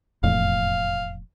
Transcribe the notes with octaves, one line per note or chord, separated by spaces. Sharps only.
E1 F2 A2 F5